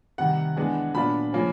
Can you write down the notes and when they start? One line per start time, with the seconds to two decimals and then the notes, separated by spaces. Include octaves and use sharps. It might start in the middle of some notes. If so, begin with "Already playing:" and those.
0.18 C3 D#3 G3 F#5
0.56 E3 G#3 B3 D4
0.95 A#2 F#3 B3 D4 F4 B5
1.33 C#3 F3 A#3 C#4